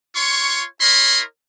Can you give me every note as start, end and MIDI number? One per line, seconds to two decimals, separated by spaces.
0.15 0.64 65
0.15 0.64 73
0.15 0.64 84
0.15 0.64 85
0.81 1.21 64
0.81 1.21 70
0.81 1.21 73
0.81 1.21 75
0.81 1.21 83
0.81 1.21 84